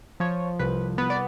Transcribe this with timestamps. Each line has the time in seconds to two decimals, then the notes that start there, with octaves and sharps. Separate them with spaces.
0.20 F3 C#5
0.59 C2 B4
0.98 B3 B4
1.10 D5